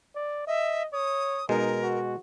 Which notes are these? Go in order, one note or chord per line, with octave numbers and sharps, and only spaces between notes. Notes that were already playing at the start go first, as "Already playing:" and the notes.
D5
D#5 E5
C#5 D#6
B2 G#3 D#4 A#4
F#4